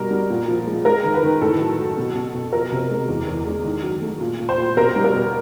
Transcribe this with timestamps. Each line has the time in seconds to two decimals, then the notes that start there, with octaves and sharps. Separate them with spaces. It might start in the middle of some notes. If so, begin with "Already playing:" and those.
Already playing: B2 G3 A#4
0.11 G3
0.30 A#2
0.48 F3
0.67 G#3
0.85 G#3 A#4
1.04 D#3
1.14 B4
1.23 D#3
1.41 A2 A4
1.60 F#3
1.79 F#3
1.97 B2
2.15 B2
2.34 B2
2.53 F3 A#4
2.72 C3
2.90 G#3
3.08 E2
3.27 E2
3.47 G#3
3.64 D#3
3.83 F#3
4.02 A3
4.21 A#2
4.40 A#2
4.49 C5
4.58 A#2
4.77 B2 A#4
4.96 G3
5.04 A#4
5.13 B2